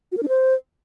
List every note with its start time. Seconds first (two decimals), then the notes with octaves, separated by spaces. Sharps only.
0.12 F#4
0.17 A#4
0.23 D4
0.28 C5